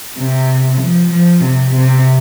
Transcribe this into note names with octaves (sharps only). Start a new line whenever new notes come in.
C3
F3
F3
C3
C3